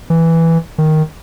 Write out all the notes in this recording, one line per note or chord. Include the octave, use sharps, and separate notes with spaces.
E3
D#3